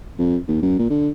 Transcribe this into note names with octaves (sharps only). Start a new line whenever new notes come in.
F2
D#2
F#2
A#2
D3